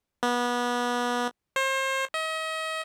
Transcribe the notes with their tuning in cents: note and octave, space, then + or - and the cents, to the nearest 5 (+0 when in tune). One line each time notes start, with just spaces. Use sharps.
B3 -25
C5 +35
D#5 +40